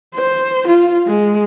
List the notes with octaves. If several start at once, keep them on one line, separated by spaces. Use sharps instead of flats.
C5
F4
G#3